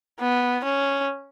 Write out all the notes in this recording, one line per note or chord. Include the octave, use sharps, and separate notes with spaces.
B3
C#4